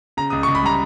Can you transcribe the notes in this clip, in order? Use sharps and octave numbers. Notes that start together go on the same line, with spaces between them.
C#3 A#5
C#2 D#6
C#2 C#6
B5
G3 A#5